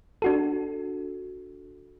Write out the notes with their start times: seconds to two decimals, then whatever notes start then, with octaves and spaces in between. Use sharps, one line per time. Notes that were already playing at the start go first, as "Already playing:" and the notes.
0.22 D4 F#4 A4